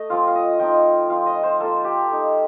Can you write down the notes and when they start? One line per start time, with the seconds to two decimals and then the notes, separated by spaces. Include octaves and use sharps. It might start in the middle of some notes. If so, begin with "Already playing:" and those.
Already playing: A3 D#5
0.10 F3 C4 F4 F5
0.27 F5
0.35 D#5
0.60 F3 C4 D#4 G5
1.10 F3 C4 F4 F5
1.26 D#5
1.43 C5
1.60 A#3 F4 A4
1.84 G4
2.10 A3 D#4